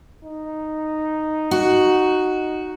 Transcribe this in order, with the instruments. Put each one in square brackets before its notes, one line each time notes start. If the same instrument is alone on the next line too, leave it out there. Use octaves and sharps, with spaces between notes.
[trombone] D#4
[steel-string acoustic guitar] F#4